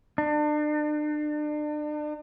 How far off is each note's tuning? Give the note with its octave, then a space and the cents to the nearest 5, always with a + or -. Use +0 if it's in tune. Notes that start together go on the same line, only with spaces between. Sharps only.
D4 +35